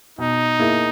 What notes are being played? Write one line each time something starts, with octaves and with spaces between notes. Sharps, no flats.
B2 D#4
A#3 E4 G#4